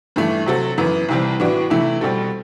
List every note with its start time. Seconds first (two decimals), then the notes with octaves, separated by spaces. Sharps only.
0.16 G2 E3 A3
0.46 C3 F#3 C4 F#4 A4
0.78 F#2 E3 B3
1.09 C2 C3 E3 G3 C4
1.40 A2 E3 B3 D4 F#4
1.70 C3 E3 A3 E4
2.01 B2 G3 C4 F#4 A4